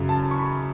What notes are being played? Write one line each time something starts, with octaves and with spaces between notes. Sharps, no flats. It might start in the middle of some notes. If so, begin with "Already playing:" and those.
Already playing: F#2 C#3 F#3
A5
C#6
B5